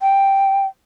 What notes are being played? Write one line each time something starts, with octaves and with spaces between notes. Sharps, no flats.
G5